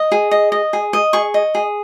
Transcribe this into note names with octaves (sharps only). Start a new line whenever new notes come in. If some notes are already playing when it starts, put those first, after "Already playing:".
Already playing: D#5
G#4
D#5
D#5
G#4
D#5
G#4 C#6
D#5
G#4